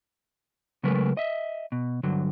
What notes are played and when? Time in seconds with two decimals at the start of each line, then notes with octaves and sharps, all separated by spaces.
0.83 C#3 F#3 G#3 A3 A#4 B4
1.17 D#5 E5
1.72 B2
2.03 G2 D3 F#3